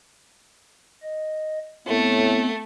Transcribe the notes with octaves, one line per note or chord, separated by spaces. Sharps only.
D#5
A2 A3 B3 C4